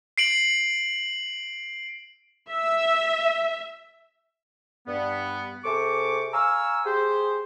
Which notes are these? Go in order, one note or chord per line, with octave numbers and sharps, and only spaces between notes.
C7 D7 F#7
E5
G2 B3
C3 G#4 A4 C5 C#6 D6
F5 G#5 A#5 C#6 E6
G4 G#4 C5